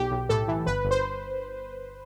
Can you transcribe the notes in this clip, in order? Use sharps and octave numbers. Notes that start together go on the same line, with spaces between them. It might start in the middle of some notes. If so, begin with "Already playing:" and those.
Already playing: B1 G4
B1
A2 A4
E3
G1 B4
G1
C5